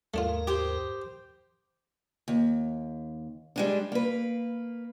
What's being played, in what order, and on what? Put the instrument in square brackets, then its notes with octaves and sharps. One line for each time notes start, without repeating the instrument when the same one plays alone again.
[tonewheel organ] D#2 G#2 A#4 [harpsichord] A3 D4 F4
[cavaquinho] G4 C5
[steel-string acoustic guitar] D#2
G3 G#3 D4
A#3 B4